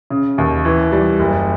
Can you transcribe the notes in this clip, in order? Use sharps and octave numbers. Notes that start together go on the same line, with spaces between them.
C#3
D#2
E3
G3
F#1